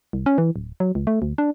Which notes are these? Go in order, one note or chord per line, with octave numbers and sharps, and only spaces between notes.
C2
C#4
E3
D1
F#3
C#2
A3
D2
D4